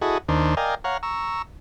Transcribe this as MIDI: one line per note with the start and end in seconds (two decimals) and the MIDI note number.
0.02 0.18 64
0.02 0.18 66
0.02 0.18 68
0.02 0.18 69
0.02 0.18 75
0.29 0.55 39
0.29 0.55 51
0.29 0.55 62
0.29 0.55 72
0.57 0.75 70
0.57 0.75 74
0.57 0.75 75
0.57 0.75 77
0.57 0.75 79
0.57 0.75 80
0.84 0.97 73
0.84 0.97 77
0.84 0.97 78
0.84 0.97 82
1.03 1.42 82
1.03 1.42 85
1.03 1.42 88